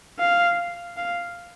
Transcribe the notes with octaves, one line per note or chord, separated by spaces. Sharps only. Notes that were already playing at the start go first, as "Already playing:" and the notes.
F5
F5